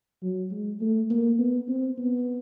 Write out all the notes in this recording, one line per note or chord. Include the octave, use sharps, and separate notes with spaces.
F#3
G#3
A3
A#3
B3
C4
B3